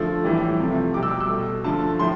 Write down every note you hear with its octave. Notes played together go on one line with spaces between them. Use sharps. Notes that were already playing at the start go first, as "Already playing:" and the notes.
Already playing: D3 F3 A3 E6
A2 E3 G3
C3 F3 A3
B2 G3 D6
E6
D6
E6
B2 A3
D3 F3 A3 A5
A2 F3 C6